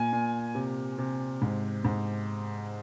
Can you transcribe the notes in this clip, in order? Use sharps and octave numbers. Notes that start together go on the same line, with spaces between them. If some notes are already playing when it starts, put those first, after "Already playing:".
Already playing: A#2 G#5
A#2
C3
C3
G#2
G#2